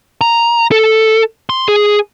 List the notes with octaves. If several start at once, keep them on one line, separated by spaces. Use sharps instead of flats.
A#5
A4
C6
G#4